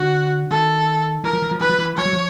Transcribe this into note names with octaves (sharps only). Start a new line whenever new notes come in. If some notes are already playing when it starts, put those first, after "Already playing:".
Already playing: D3 F#4
D#3 A4
E3 A#4
F3
E3
F3
E3 B4
F3
E3
F3 C#5
F#3
F3